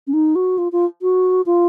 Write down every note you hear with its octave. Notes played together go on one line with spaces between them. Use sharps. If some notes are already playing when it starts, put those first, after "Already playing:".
C#4
D#4
F#4
F4
F4
F#4
F4